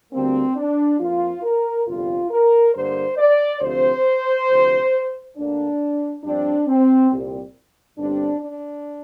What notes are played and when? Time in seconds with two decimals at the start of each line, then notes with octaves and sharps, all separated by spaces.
0.13 D2 D3 G3 A#3 C4
0.56 D4
1.00 F2 F3 A#3 F4
1.43 A#4
1.87 G1 F2 C3 G3 F4
2.31 A#4
2.74 G2 D3 A#3 C5
3.18 D5
3.61 D2 C3 F3 C4 C5
4.49 D2 C3 F3
5.36 D2 D3 A#3 D4
6.24 G2 F3 C4 D4
6.67 C4
7.11 C2 A#2 G3 C4
7.98 G1 G2 G3 C4 D4
8.41 D4